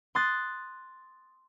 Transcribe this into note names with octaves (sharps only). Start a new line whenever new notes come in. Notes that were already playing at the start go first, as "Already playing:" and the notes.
C6 D#6 F#6 A6